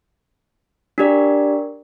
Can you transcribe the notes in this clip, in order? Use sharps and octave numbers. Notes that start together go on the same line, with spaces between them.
D4 G4 A#4 D5